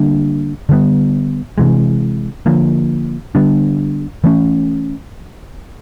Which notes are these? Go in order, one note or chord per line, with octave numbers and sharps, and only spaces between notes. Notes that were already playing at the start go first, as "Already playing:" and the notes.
Already playing: D3 G3 A#3 D4
D3 G3 B3
C3 E3 G#3
D3 F3 A#3
D3 G3 B3 D4
E3 A3 C#4